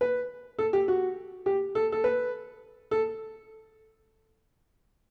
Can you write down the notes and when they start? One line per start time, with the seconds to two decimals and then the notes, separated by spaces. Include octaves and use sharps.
0.01 B4
0.59 A4
0.73 G4
0.88 F#4
1.46 G4
1.75 A4
1.92 A4
2.04 B4
2.91 A4